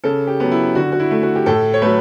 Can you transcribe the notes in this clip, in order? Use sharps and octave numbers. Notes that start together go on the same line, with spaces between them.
C#3 A4
G4
F#3 B3
E4
D3 F#4
F#4
E4
A3
F#4
G4
A2 A4
C#5
F#3 A3 B4